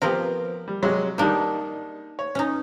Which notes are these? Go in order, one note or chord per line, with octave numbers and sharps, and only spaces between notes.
F3 B3 C4 G4 A#4
G3
C3 F#3 G#3
D#3 G3 A#3 D4 D#4
C#5
C#4 D#4